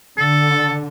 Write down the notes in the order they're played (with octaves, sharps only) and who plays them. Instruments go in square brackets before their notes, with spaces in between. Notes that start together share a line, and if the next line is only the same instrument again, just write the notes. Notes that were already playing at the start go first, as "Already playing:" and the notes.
[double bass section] D3 [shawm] A4